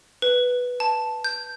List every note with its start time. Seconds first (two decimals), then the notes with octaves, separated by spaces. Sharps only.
0.22 B4
0.80 A5
1.24 G6